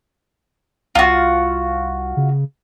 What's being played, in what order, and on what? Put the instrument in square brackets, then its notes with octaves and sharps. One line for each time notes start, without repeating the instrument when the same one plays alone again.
[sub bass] C2 [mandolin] F4 F#4
[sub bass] C#3